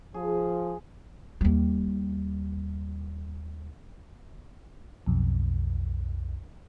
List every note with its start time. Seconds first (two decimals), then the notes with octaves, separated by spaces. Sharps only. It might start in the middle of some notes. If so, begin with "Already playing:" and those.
0.14 F3 G#4
1.41 D#2 G3
5.06 B1 F2